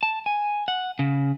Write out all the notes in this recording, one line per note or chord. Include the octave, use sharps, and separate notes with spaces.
A5
G#5
F#5
C#3